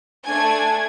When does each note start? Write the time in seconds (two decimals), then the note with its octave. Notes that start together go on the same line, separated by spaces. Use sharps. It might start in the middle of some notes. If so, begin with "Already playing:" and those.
0.25 A3 D4 G#5 G#6